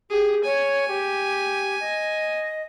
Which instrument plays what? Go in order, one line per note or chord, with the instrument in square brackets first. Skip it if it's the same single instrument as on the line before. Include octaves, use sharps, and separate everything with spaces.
[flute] G4 [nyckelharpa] G#4
[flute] C#5 [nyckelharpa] G#5
[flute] G4
D#5